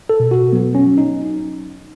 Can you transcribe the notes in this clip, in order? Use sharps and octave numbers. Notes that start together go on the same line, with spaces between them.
A4
B2
F#4
F#3 B3
C#4
F#3
D#4